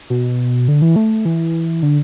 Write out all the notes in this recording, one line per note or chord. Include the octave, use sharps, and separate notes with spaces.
B2
D3
E3
A3
E3
D3